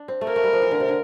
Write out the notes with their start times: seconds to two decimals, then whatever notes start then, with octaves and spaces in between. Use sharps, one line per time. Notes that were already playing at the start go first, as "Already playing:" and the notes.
Already playing: D4
0.08 C4
0.21 A3
0.27 A#3 A#4
0.36 A3
0.44 G3
0.53 F3
0.62 E3
0.71 D3
0.80 C3
0.88 D3